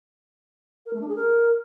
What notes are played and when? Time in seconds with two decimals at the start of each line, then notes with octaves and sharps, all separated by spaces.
0.86 A#4
0.93 A3
1.01 D4
1.08 G#4
1.16 A#4